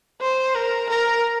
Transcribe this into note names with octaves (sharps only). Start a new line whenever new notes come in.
C5
A#4
A#4